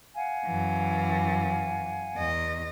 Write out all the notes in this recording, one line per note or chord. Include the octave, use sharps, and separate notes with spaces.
F5 F#5 G#5
F#2 E3
E2 D#5